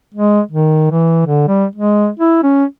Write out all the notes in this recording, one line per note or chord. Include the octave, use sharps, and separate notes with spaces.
G#3
D#3
E3
D3
G3
G#3
E4
C#4